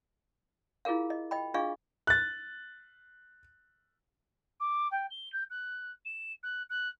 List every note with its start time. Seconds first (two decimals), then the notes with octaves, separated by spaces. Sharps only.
0.85 E4 F4 G#4 A#4 F5
1.10 D#5
1.31 D#5 G5 B5
1.54 D4 F4 G#4 D#5 F5 C#6
2.07 F#6 A6
4.60 D6
4.91 G5
5.11 G7
5.33 G6
5.50 F#6
6.05 E7
6.43 F#6
6.70 F#6